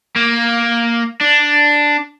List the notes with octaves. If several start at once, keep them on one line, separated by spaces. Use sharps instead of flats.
A#3
D4